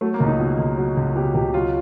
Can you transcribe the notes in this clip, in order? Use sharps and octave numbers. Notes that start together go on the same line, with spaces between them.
F#3 A3
A#3
C#2
D#4
B2
C#2
F#3
C#2
B2 G4
C#2 G4
F#3 F4